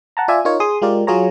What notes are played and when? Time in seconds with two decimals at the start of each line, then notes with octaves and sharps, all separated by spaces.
0.17 F#5 A5 A#5
0.28 F4 D5 E5 G#5
0.45 D#4 F4 A#4 C#5
0.60 G#4 C6 D#6
0.82 G#3 F4 G4 A#4 D5
1.07 F#3 F4 G#4 C#5 A#5